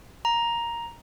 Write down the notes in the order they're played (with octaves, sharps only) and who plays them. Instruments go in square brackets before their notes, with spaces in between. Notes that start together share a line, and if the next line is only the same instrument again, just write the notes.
[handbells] A#5